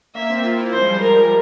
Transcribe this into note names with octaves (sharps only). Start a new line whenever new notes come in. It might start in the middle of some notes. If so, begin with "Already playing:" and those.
A#3 E5
C4
F4
E4
F3 C5
G#3
G3
G#3 A#4